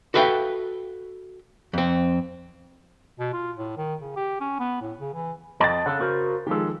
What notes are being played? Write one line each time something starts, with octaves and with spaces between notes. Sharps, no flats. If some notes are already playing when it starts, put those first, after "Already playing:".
F#4 A4 B4 E5 F5 G5
F2 C4
B2
F4
A2
D#3
C#3
G4
C#4
B3
A2
C#3
E3
F2 D#5 A5 A6
C#3 A4 F#5
F#4 A#4 C5
D#3 F3 G#3 G4 A4